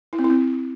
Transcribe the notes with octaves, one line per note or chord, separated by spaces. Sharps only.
E4
C4
E4
C4